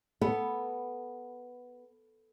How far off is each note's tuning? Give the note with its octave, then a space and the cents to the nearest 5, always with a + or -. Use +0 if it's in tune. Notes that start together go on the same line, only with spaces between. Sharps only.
B3 +0 A4 +0